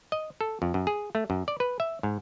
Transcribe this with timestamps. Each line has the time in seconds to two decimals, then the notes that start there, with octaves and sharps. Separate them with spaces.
0.12 D#5
0.41 A4
0.62 F2
0.74 F#2
0.87 G#4
1.15 A3
1.30 F#2
1.48 D5
1.60 B4
1.80 E5
2.03 G#2